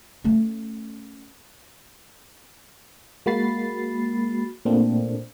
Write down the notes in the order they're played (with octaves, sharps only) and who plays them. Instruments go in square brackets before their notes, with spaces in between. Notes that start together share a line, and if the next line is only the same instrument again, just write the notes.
[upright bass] A3 C#4
[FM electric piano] G#3 A#3 F#4 B5 A6 C7
A#2 A3 A#3 C4 D4